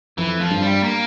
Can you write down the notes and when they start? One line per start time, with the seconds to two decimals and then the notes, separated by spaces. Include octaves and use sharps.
0.18 F2 E3
0.40 F3
0.51 G2
0.62 G3
0.83 A#3